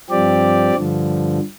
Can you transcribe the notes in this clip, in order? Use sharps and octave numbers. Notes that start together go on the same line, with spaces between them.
G2 F3 C4 G4 D5
G2 D3 F3